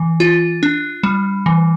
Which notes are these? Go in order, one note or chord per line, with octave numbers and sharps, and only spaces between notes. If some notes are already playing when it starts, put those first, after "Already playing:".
Already playing: E3
F4
D4
G3
E3